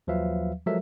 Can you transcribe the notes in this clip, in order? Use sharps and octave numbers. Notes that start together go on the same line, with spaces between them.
D#2 F3 F#3 B4 E5 F5
F3 F#3 G#3 A4 A#4 E5